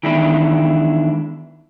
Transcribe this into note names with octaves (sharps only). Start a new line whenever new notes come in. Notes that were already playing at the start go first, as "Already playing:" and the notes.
D#3 E3 G#3 B3 D4 E4